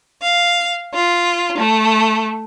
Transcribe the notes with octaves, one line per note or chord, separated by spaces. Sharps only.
F5
F4
A3